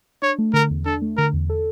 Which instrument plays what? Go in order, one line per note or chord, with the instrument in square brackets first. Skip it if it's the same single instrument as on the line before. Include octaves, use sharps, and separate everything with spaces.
[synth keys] D4 [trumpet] C#5
[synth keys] A3
[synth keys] D3 [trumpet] A#4
[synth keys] E2
[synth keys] D4 [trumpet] A4
[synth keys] A3
[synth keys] D3 [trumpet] A#4
[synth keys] E2
A4